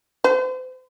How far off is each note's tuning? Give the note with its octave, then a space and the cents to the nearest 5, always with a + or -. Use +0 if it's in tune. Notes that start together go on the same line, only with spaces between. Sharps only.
C5 -40